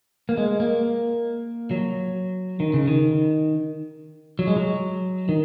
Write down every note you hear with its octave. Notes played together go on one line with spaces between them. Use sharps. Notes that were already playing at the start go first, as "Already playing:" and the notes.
A#3
G#3
A#3
F#3
D#3
C#3
D#3
F#3
G#3
F#3
D#3